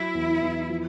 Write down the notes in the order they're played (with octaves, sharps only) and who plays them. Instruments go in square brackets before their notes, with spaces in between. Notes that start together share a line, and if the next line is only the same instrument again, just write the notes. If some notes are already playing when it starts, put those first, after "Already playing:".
Already playing: [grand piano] F#3 [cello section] E4
[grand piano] E2
E2
F3